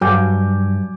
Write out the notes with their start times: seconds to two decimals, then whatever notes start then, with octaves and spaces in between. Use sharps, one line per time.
0.01 G2 F#3 G#5 D6 G6